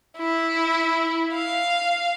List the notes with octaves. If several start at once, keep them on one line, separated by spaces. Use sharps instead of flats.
E4
F5